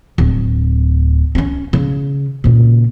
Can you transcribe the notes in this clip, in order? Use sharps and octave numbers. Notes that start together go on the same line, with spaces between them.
D1
C4 C#4
C#3
A#2 C#3